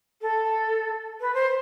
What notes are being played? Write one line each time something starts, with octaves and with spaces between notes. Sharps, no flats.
A4
B4
C5